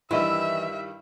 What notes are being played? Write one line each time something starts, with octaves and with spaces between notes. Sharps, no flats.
G2 D#3 E3 G3 E4 D#5 E5